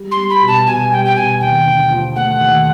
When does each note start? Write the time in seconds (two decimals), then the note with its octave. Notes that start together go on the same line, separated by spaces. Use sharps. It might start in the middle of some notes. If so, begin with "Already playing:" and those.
Already playing: G3
0.11 C6
0.17 G3
0.30 B5
0.42 B2
0.48 A5
0.67 B2 G#5
0.91 G3 G5
1.05 G5
1.16 B2 G#5
1.41 D#2 G5
1.66 D3
1.91 F3
2.16 A3 F#5
2.41 D#2